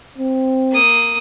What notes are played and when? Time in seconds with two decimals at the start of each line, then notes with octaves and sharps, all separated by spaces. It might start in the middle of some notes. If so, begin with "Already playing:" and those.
0.18 C4
0.72 A#3 D#6